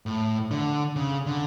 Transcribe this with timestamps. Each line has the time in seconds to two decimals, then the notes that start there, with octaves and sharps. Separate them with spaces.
0.06 A2
0.51 D3
0.96 C#3
1.26 D3